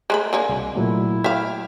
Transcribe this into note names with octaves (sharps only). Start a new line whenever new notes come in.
G#3 A3 B5
D3 G#3 A#3
C2
A#2 F#3 A3 E4
E5 F5 G5